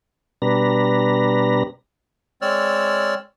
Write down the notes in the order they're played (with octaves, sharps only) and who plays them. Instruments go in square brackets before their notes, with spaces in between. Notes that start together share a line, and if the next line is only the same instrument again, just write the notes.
[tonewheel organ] B2 G3 D4 B4 A#5
[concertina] G#3 C4 C#5 D5 E6 F6